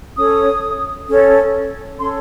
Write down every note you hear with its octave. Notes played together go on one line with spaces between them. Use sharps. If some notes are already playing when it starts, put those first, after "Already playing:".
C#4 A4 C#5 D#6
C#4 A4 C#5
C#4 A4 C#5 C6